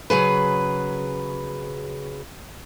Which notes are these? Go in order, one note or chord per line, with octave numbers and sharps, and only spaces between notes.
C#3 F#3 G#4 B4